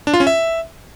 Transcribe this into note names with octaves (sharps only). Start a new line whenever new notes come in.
D4
F4
C#4
E5